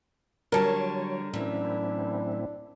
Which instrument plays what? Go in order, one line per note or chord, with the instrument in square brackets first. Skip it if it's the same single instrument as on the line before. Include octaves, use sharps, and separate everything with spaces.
[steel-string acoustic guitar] D3 G3 [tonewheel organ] F#3 C#5 [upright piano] A#4 A5
[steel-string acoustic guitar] F#2 E3 [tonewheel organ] A2 C4 E4 [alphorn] D4